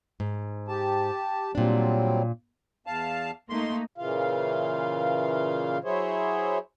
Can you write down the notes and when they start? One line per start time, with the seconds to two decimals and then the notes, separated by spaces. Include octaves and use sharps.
0.20 G#2
0.68 G4 A5
1.55 A#2 F#3 G3 C4 D4
2.87 E2 F5 A5
3.50 A3 A#3 D#4 C6
3.98 A#2 C#3 E3 F4 F5
5.84 F#3 E4 G#4 C5 C#5